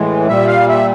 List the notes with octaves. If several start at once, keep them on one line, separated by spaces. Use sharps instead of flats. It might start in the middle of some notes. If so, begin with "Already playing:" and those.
Already playing: A2 E3 G#3
A#2 G3 E5
F5
E5